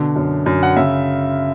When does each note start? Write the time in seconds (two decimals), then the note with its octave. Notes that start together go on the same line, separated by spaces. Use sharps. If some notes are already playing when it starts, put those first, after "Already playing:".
Already playing: B2 D3
0.16 F#2
0.46 F#2
0.63 F#5
0.76 C#3 E5